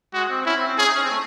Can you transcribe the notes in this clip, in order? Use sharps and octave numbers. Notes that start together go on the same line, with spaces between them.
G#3 F#4
C4
C4
C#4 E4
C4
C4
C#4 G#4
D#4
C#4
C4
A3